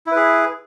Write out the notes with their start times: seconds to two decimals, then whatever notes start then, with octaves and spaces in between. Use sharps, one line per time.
0.07 E4
0.11 B4
0.16 G#4